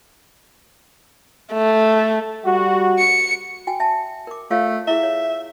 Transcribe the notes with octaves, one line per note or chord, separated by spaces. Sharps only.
A3
G3 F#4
C#7
F#4 G5 G#5
E5 A5
A#4 D6
A3 F4 C#5 F5
E4 G#4 E5
C#5